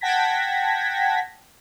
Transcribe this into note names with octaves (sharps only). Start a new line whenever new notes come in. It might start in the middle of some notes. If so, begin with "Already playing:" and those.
F#5 G5 A5 G#6 A#6 B6